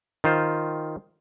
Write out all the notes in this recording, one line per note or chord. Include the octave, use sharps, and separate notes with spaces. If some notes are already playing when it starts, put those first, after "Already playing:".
D#3 F4 C5